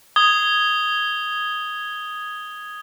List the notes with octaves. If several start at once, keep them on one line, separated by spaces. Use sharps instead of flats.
D#6 G#6 G7